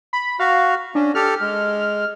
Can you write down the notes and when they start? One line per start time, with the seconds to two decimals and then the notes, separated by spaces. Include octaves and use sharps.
0.13 B5
0.40 F#4 F5
0.95 C#4 D4
1.15 G4 A4 F6
1.41 G#3